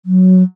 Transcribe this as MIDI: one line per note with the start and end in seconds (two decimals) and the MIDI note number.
0.06 0.43 54